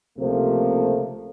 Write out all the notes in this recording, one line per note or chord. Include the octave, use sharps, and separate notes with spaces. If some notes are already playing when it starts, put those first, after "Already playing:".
C#2 C3 F3 A3 A#3